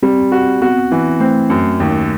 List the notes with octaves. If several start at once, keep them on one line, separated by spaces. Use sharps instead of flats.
G3 C4
F#4
B3 F#4
E3
A3 C4
F#2
D#2